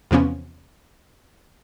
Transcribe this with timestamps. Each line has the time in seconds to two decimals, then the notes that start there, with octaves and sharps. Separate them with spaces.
0.11 E2 C3 F3 B3 C#4